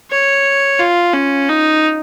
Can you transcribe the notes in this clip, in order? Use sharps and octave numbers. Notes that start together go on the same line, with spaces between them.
C#5
F4
C#4
D#4